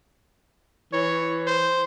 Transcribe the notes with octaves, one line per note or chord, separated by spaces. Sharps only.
E3 C#5
C5